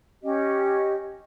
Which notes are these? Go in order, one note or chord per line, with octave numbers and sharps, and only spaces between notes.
C#4 G4 D#5